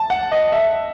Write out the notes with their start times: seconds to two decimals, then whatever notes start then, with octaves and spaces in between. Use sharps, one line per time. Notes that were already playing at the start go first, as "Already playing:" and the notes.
Already playing: A5
0.10 F#5
0.32 D#5
0.52 E5